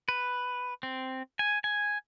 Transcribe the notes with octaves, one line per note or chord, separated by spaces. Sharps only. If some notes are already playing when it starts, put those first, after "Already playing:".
B4
C4
G#5
G#5